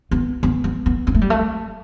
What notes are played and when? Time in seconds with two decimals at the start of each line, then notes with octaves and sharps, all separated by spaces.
0.11 B3
0.43 B3
0.64 B3
0.86 B3
1.07 B3
1.14 A3
1.21 G3
1.30 A3